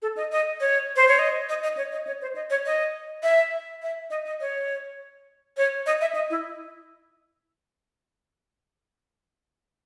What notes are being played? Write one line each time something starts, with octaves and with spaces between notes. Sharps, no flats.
A4
D#5
D#5
C#5
C5
C#5
D#5
D#5
D#5
C#5
D#5
C#5
C5
D#5
C#5
D#5
E5
E5
D#5
D#5
C#5
C#5
D#5
E5
D#5
E4